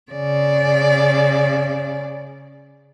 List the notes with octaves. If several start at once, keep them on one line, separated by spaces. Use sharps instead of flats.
C#3 D5